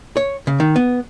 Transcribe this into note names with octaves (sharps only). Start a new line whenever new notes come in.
C#5
C#3
D#3
B3